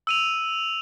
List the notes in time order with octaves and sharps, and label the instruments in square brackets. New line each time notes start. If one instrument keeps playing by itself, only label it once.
[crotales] E6 D#7 F7